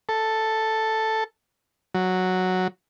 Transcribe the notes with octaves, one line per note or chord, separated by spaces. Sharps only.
A4
F#3